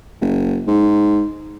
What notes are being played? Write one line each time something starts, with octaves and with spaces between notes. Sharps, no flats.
F#1
G#2